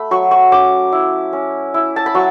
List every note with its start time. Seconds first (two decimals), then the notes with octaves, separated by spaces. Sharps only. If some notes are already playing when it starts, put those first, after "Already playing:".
Already playing: A3 B5
0.11 F#3 C#6
0.31 C#6
0.52 C#4 D6
0.92 E4
1.33 C#4
1.74 E4
1.96 A5
2.06 B5
2.15 F#3 C#6